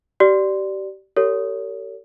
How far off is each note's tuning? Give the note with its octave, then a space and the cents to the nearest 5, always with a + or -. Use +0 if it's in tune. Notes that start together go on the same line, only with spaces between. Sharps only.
G4 -30 D5 +0
G4 -20 A#4 -45 C#5 +25